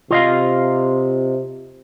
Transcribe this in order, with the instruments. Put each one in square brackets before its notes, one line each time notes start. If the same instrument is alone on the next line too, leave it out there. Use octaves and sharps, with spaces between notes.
[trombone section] C3 [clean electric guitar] F4 D#5 F5